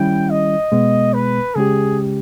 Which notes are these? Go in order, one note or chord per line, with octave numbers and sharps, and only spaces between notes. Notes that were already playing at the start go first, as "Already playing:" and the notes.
Already playing: D#3 G3 C#4 E4 G5
D#5
B2 G#3 B3
B4
C#3 G#3 C#4 G4 G#4